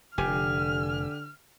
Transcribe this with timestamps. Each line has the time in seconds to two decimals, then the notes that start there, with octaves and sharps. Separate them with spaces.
0.18 F1 D3 G4 G#5 F6